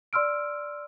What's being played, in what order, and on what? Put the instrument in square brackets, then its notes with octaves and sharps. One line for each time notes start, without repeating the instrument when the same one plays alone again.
[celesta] D5 C6 E6 F6 D7